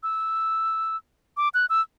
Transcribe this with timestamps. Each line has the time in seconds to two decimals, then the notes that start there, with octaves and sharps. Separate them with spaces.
0.03 E6
1.37 D6
1.54 F#6
1.70 E6